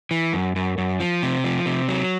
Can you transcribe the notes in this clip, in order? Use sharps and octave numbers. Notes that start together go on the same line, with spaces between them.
E3
F#2
F#2
F#2
F3
C3
F3
C3
F#3